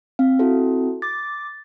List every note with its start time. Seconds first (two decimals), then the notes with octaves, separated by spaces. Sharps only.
0.19 C4 F5
0.39 E4 F#4 A4
1.02 D6 A6